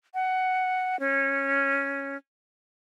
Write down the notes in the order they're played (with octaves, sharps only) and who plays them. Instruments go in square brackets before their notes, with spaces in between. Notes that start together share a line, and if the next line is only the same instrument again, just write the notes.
[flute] F#5
C#4